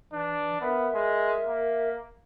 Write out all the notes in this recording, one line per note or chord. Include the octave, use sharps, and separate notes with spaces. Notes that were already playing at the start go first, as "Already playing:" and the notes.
E3 D4
B3 A#4 E5
G#3
A#3